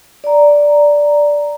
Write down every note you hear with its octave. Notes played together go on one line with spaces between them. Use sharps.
D5 A#5